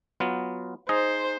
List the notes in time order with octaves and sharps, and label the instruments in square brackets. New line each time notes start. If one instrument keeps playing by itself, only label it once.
[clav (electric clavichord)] F#3 B3 F4
[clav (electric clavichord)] D#4 G#4 D#5 [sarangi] C5